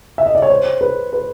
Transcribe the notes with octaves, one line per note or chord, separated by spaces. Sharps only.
E5
D#5
D5
C#5
C5
B4
B4